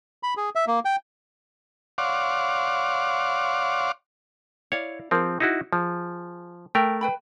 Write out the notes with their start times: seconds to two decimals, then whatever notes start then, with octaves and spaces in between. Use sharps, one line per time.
0.23 B5
0.37 G#4
0.55 E5
0.67 A#3
0.85 G5
1.98 C#5 D5 F5 F#5 C6 D6
4.72 E4 C#5 D5 F5
5.11 F3 C4 G#4 A#4
5.40 D#4 E4 F#4
5.73 F3 G#4
6.75 A3 A#4 G5
7.01 B4 G5 B5